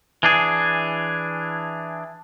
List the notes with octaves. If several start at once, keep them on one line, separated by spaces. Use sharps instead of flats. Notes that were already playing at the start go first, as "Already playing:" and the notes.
E3 D4 G#4